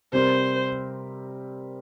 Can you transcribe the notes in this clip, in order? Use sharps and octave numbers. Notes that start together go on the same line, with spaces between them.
C3 G3 C4 G4 A#4 C5